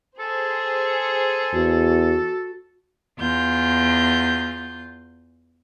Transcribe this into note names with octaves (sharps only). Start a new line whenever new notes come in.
G#4 A4 C5
E2 F#4
E2 F4 G6